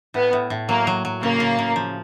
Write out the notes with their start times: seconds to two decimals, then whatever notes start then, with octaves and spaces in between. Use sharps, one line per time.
0.14 A2 B3
0.33 A2
0.50 A2
0.69 F#3 A#3
0.87 F#3
1.05 F#3
1.22 C#3 A#3
1.40 C#3
1.59 C#3
1.76 F3